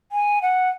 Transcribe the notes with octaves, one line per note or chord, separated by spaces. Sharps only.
G#5
F#5